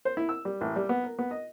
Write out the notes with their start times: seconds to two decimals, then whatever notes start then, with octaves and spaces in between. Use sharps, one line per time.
0.05 C5
0.17 E4
0.29 E6
0.45 G3
0.61 A1
0.76 G3
0.89 B3
1.04 A#4
1.19 B3
1.31 D#5